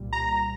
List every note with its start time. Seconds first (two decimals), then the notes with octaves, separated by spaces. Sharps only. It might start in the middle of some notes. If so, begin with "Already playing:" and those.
Already playing: C2 A#2 G3
0.13 A#5